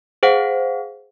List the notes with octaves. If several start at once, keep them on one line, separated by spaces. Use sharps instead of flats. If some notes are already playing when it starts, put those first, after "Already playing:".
G#4 C5 F5 F#5